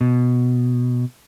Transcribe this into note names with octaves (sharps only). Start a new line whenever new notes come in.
B2